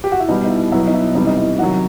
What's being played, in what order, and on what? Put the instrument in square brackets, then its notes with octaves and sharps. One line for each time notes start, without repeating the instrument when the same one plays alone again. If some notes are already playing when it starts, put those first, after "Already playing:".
[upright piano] G4
F#4
E4
B2 G3 D#4
D#4
E4
B2 F#3 E4
D#4
E4
C3 E3 G3 D#4
D#4
E4
C3 D#3 F#3 F#4